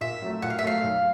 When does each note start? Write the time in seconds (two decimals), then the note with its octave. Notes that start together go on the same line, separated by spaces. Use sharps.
0.01 A#2 E5
0.22 F#3 A3
0.42 A#2 F#5
0.50 F5
0.59 E5
0.63 F#3 A3 F5
0.83 B1